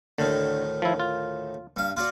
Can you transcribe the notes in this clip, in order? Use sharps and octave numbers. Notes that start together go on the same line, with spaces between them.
D2 A2 D3 D#3
F3 E4
F4
G2 F5
F4 F#4 D5